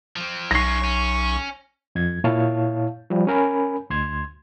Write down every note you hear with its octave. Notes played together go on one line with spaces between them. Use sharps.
F3 C4
B1 C#4 D#4 C#6 A#6 C7
C#4
F2 G#6
A#2 E4 C#5 F5 A5
F3 G3
C#4 A#4 G#5 B5
D2 C6 G#6